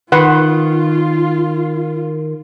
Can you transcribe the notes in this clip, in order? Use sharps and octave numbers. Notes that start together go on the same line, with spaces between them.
D#3 F4 B4 F#5 C6